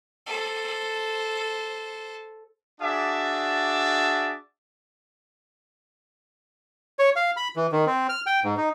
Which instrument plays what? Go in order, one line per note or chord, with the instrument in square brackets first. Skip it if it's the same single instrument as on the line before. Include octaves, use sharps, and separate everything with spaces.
[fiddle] A4 C5
[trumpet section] D4 F#4 G#4 E5 A5 D6
[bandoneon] C#5
F5
B5
E3
D#3
C4
F6
G5
G#2
D#4